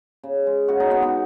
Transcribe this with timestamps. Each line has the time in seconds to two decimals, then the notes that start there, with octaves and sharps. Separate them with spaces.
0.23 C#3
0.47 G#3
0.68 C#3 F#4
0.80 D#4
0.91 G#3 B3
1.02 B3